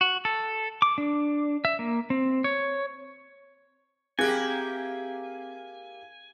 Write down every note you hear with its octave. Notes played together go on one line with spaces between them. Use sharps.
F#4
A4
D6
D4
E5
A#3
C4
C#5
A#3 C4 E4 G4 G#4 G#5 F#6